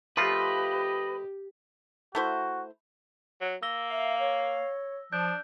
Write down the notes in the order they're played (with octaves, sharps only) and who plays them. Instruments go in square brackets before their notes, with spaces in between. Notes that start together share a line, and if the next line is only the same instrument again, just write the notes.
[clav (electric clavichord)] F3 A3 F4 [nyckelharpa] G4 [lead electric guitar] B4 [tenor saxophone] D#5
[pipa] A3 E4 C5 [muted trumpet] F#4
[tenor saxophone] F#3
[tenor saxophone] A#3 [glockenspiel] E6 A#6 G7
[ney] E5 [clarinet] F5
[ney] C#5
[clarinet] F3 [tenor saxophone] D4 [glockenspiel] G6